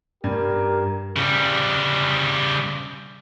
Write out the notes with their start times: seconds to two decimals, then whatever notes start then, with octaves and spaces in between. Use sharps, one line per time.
0.24 G2 G4 A#4
1.16 C#3 G3